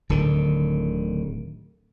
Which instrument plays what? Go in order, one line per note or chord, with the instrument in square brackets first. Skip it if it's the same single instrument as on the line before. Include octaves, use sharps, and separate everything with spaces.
[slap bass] D1 D3 D#3